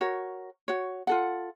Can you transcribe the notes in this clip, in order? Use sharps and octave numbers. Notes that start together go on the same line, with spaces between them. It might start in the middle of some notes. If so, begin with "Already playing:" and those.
F#4 A#4 C#5
F#4 C#5
F4 A4 F#5